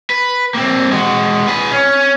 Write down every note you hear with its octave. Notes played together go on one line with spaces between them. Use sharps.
B4
A#3 C4
G#3 F#4
G#4 B4
C#4